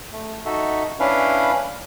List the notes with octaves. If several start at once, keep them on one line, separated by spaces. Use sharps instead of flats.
A3
D#4 F#4 A4 E5
C#4 D4 E4 B4 F5